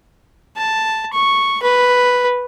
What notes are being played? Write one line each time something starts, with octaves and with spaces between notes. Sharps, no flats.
A5
C#6
B4